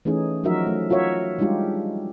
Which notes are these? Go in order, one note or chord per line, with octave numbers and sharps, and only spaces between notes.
E3 A3 C#4 D#4 G#4
F3 F#3 D#4 F#4 A#4 E5
A3
F4 F#4 A#4 C#5 E5
G3 G#3 D4 D#4 F4 G4